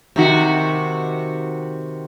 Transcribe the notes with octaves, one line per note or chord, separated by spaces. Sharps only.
C3 D#3 F#4